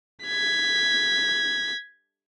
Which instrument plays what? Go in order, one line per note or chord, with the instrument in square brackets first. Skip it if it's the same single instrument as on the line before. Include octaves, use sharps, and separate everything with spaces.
[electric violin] G#6 B6